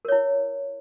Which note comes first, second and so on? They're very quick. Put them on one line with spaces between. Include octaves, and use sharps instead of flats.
A#4 C#5 E4